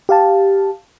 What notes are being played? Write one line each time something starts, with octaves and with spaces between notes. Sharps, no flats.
G4 F5 A5